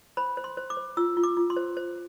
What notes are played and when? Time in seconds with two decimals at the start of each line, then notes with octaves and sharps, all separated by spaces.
0.17 C5 B5
0.37 C5
0.44 C6
0.57 C5
0.70 D6
0.77 C5
0.97 F4 E6
1.17 F4
1.23 D6
1.37 F4
1.50 C6
1.57 C5
1.77 C5